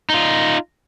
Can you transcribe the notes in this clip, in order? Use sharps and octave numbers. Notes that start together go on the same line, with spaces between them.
D#4 F4